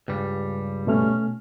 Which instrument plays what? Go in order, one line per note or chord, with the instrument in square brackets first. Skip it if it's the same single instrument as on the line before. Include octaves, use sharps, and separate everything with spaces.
[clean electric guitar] C#2 G2 G3
[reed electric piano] B2 A3 F6 [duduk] C#4